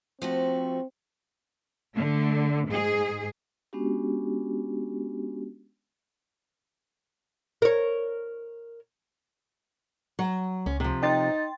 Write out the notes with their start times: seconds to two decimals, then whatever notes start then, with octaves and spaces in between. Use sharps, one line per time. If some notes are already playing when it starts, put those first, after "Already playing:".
0.22 F3 A3 C4 F#4
1.94 D3 A3
2.67 G#2 G#4
3.73 G#3 B3 C#4 D4 F#4 G4
7.62 A#4 C#5
10.19 F#3
10.66 C#2 C#4
10.80 C3 F3
11.03 D#4 G5 C6 A6